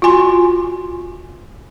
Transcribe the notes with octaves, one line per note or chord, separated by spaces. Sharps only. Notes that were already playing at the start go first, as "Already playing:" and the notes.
F4 F#4 G#5 C6